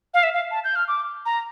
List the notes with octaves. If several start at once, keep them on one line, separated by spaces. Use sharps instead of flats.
F5
E5
F5
A5
G6
F6
D6
A#5